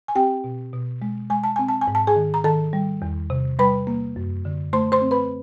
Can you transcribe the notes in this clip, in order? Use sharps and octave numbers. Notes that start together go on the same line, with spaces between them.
G#5
C4 G4 G5
B2
B2
G#3
G#3 G#5
A5
C4 G#5
A5
G#5
G#2
A5
G#4 G#5
D#3
A#5
D#3 A4 A5
G3
E2
C3
G3 B4 B5
A#3
F#2
D3
A3 C5 C6
C5 C6
C4
B4 B5